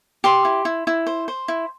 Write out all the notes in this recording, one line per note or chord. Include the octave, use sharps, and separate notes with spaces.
G4 C6
E4
E4
E4
C5
C5
E4